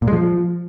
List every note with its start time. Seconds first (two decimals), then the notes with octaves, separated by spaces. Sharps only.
0.02 A#2
0.07 G#3
0.13 F3